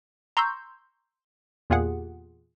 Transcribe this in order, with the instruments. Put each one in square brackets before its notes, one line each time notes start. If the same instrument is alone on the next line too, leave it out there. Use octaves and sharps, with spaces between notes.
[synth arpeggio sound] A#5 C6 C#6 E6 G6
E2 A#2 F4 G4 G#4 F#5